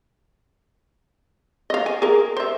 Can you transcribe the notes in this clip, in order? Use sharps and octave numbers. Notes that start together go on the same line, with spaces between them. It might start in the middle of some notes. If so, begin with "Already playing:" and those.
D#5 F5
G#5
G#4 A#4
C5 E5